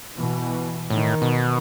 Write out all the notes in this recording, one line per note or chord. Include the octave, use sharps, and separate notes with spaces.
B2 E3
A2 D#3
B2